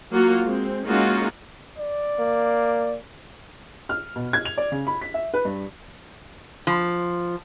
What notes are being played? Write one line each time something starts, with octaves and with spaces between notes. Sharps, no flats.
F#3 A#3 F4 F#4
G#3 C4
G#3 A#3 C#4 D#4 F4 F#4
D5
A#3
F6
B2
G#6
F7
D5
C#3
B5
B6
E5
B4
G2
F3